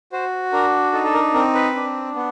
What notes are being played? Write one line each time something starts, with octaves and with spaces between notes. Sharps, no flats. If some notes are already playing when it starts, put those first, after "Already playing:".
F#4 C5
D4 A#4
D#4 A4
A4
A#4
C4 A#4
B4
D4
B3